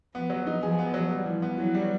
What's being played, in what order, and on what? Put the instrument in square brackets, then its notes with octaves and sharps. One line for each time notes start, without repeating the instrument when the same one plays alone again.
[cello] F3 [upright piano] B3
[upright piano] F#3
D#4
[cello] F3 [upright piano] G#4
[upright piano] B3
F#3
[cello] F3 [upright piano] G3
[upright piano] E3
B3
[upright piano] E3 [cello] F#3
[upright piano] G3